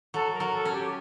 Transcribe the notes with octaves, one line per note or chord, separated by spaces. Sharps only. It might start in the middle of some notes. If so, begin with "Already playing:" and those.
F#3 A4
A#4
F#3
A4
C#4
G4